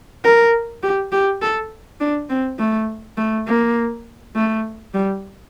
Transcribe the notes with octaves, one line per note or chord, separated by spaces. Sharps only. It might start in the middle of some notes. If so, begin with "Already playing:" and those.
A#4
G4
G4
A4
D4
C4
A3
A3
A#3
A3
G3